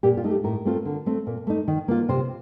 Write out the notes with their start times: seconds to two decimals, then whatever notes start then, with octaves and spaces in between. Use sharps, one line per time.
0.03 A#2 G4
0.17 F4
0.24 A3 D#4
0.31 G4
0.44 A2 A#4
0.65 A3 C4 F4
0.85 D3
1.06 A3 C4
1.27 A#2
1.47 A3 D#4
1.68 D#3
1.88 A#3 F4
2.09 C3 C5